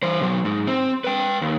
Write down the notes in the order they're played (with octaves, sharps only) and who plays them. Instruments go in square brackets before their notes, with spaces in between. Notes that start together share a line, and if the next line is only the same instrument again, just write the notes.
[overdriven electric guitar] E3 C5
B2 F#3
G#2
C4
B4 G5
D#2